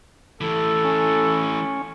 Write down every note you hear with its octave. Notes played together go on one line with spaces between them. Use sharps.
E3 A3 A4
C#4